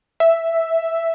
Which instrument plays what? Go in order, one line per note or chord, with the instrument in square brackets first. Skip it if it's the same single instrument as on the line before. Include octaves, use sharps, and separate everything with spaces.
[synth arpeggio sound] E5